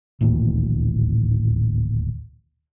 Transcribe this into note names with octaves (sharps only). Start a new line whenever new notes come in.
D1 A1 D#2 A#2